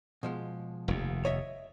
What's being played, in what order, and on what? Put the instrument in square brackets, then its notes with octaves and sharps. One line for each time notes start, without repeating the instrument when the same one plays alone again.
[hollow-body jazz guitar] B2 F3 G#3
[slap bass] F1 D#2
[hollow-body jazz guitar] C#5 D#5 E5